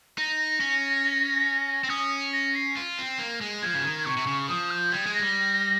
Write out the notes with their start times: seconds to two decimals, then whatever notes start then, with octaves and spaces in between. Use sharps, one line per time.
0.18 D#4 A#6
0.60 C#4
1.84 C4
1.90 C#4 D#6
2.33 A#6
2.55 C7
2.77 F4
2.99 C4
3.19 A#3
3.41 G#3
3.63 F3 G#6
3.75 C#3
3.84 D#3
4.05 C3 C#6
4.17 C3
4.27 C#3
4.48 F3 D#6
4.71 G6
4.92 G3 G#6
5.06 G#3
5.14 A#6
5.19 G3